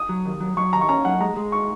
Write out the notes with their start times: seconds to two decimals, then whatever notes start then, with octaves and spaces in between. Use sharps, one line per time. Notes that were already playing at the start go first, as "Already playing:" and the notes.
Already playing: D#6
0.09 F#3
0.26 D#2
0.41 F#3
0.57 F#3 C#6
0.73 D#2 A#5
0.81 C#6
0.89 C#4 A#5
1.05 F#3 F#5
1.20 G#3 A#5
1.37 G#3
1.52 C#6